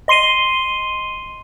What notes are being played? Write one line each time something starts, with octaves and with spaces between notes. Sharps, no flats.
D#5 C6 C7 D#7 G7